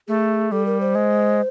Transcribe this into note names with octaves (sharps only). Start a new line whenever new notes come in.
A3 G#4
G3 A4
A#4
C5
G#3